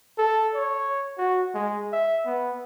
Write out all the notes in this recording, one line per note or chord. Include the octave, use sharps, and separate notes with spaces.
A4
C#5
F#4
G#3
E5
B3